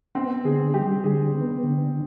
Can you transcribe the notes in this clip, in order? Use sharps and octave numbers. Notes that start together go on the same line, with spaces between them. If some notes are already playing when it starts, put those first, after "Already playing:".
B3 C4
D3 G#4
G3 G4
D3 G#4
B3
D3